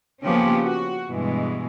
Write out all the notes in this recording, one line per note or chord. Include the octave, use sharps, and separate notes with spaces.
C#3 F3 A#3 B3 C#4 G4
F#4
G2 B2 E3 G#3